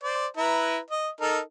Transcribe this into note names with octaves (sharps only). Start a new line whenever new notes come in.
C5 D5
E4 B4 A#5
D#5
D#4 A4 A#4